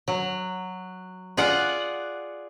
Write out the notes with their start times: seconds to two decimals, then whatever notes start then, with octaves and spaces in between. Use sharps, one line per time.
0.08 F#3
1.37 F4 G#4 D5 F#5